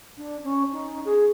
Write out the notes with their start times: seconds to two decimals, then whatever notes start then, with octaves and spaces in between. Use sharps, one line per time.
0.17 D4
0.43 C#4
0.72 D#4
1.05 G#4